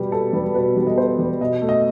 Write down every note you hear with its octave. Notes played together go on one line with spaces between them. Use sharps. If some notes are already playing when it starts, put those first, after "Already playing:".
Already playing: B2 G3 B3 G4
B2 A4
G3 B3
B2 B4
G3 B3
D#5
B2 C5
G3 B3
B2 D#5
A3
D#5